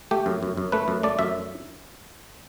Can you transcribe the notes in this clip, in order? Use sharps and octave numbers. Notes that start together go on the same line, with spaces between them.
A3 G4
F#2
F#2
F#2
A3 B4
F#2
A3 D5
F#2 E5